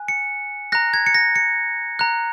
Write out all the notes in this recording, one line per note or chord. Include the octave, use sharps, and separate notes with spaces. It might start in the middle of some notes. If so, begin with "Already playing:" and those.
Already playing: G#5 F#6
C#7
A#5 F#6 A#6
G#6
C#7
A#6
C#7
A#5 F#6